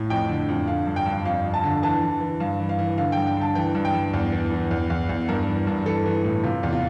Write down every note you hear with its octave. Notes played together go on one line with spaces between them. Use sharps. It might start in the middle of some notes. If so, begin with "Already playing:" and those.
Already playing: A2
F2 G5
D3
F2
D3 F5
G2
G5
G2
F2 F5
F2
A5
D3
E3 A5
E3
E3
G2 F5
E3
F5
E3
D3 F5
G2 G5
G5
D3 A5
E3 G5
G2
G5
G2
E2
E3
E3
E2
E2
E2
G2 A#4
E3
G2
E3 A4
E3
A2
C3 F4
E2
F4